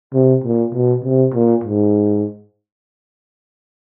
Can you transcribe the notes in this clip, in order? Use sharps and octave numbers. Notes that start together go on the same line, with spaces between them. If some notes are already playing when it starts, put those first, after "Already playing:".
C3
A#2
B2
C3
A#2
G#2